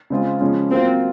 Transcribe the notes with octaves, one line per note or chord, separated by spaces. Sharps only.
C#3 G#3 C4 F4 G#4
C#3 F3 G#3 C#4
F#3 A#3 C4 F4